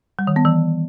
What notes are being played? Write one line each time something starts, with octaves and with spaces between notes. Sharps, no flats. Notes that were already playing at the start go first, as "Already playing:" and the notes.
G3
D#3
B3
E3